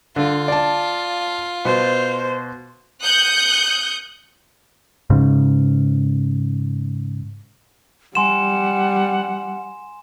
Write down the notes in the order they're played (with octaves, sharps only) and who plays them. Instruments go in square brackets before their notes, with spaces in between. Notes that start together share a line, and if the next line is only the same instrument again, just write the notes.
[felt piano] D3 [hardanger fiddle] F4
[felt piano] D5 A5
[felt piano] B2 [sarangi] C5
[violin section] D#6 F#6 G6 C#7
[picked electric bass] G#2 C#3
[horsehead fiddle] G3 [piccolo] F#5 [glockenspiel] G#5 C6 E7